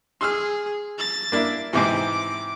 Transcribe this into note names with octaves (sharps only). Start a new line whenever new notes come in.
G#4 C6 E6 F6
A6
A#3 D4 E4
G#2 C3 E3 D6